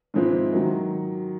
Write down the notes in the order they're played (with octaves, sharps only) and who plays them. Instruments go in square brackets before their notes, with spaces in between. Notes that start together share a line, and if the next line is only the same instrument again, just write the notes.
[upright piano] G#2 F3 G#3 C4 E4
D#3 F#3